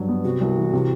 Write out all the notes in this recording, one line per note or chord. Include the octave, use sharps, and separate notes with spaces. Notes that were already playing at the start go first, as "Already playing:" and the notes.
Already playing: G2 F#3
B3
C3 F#4
C2
E3
C3